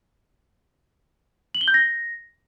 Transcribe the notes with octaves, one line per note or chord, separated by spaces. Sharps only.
F#7
G7
G6
A#6